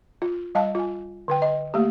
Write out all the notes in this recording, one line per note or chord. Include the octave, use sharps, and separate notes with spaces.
F4
G3 D#5 F5 A5
F4 G#5
D3 B4 G5
D#5
A3 A#3 G4